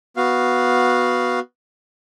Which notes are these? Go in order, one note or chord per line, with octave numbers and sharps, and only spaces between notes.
B3 F#4 F5